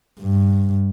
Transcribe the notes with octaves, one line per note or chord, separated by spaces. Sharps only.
G2